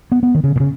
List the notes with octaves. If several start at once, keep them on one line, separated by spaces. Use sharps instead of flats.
B3
B3
D#3
C#3
B2
C#3